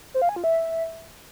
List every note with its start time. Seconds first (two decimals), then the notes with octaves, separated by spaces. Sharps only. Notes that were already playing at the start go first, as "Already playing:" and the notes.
0.14 C5
0.22 F5
0.29 G#5
0.36 F4
0.44 E5